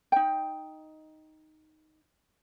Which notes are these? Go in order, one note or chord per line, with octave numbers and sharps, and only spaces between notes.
D#4 G5